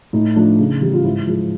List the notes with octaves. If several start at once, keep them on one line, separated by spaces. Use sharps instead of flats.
A2 D#4
F3 A3 D4
C#3
E3 G3
F4
G#2 E4
F3 G#3